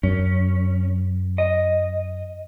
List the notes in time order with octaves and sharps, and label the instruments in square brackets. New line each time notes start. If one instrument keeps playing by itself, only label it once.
[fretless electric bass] F#2 [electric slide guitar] C#4
[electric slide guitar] D#5